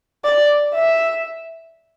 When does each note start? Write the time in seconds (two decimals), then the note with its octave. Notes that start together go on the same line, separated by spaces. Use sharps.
0.24 D5
0.74 E5